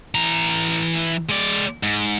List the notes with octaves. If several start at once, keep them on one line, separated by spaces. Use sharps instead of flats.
E3 A#5
G#3 D5
G#2